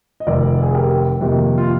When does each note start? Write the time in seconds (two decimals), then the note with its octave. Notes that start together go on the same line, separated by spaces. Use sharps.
0.20 D#5
0.27 F1 F2 D#3 A#4 D5
0.63 G#4
0.74 G4 A#4
1.21 F2 C3 D#3 A#3
1.58 F4